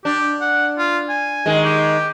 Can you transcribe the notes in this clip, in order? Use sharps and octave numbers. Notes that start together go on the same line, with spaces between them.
D4 G4
F#5
F4
G#5
D#3 G#3
G4